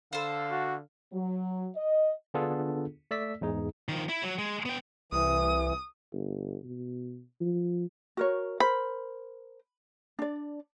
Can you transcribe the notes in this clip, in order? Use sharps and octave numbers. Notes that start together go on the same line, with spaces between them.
D3 A4 C5 F5
F#4
F#3
D#5
D3 B3 D4 F4 G#4 A4
A3 D5 E6 B6
E2 G#2 D#4 G#4
D#3 F3
E4
F#3
G#3
B3 G5
C2 E3 D#6
G1
B2
F3
F#4 A#4 C#5
A#4 C5 B5
D4 D5